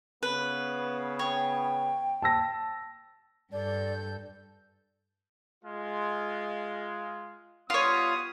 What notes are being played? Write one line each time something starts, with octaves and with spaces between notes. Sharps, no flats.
C#3 B3 B4
C#5 G5
A5 E6 A#6
G2 A4 D5 G6
G#3 F4
G3 B3 F4 C#5 D#6